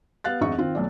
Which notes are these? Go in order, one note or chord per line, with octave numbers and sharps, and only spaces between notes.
B3 G4 F5 F#6 A6
G#1 F2 G#2 D#4 E5 C#6
D#3 C4 F4
B1 A3 D5